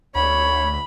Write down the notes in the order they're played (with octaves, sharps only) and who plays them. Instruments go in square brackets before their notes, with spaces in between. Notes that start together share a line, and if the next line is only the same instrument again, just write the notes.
[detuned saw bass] D2 [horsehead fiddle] C#5 [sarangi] B5